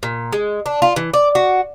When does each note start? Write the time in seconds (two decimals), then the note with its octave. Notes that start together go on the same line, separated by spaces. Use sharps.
0.03 A#2
0.33 G#3
0.66 D4
0.82 F4
0.96 E3
1.14 D5
1.35 F#4